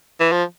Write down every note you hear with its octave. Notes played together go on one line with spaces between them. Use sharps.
E3
F3